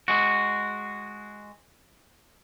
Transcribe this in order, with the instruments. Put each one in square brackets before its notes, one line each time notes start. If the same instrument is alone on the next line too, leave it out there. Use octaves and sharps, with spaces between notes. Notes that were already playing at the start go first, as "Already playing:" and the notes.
[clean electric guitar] G#3 F#4